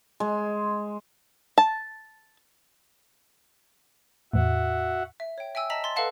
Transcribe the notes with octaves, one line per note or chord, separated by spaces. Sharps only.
G#3
A5
E2 A2 F#4 E5 F#5
E5
C#5 G5
E5 G5 G#5 E6
D#5 A5 A#5 B6 E7 F#7
C6 A6
A4 B4 D#5 F5 F#5 A5